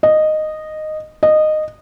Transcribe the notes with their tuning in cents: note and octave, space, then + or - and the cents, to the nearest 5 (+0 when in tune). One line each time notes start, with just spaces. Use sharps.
D#5 -10
D#5 -15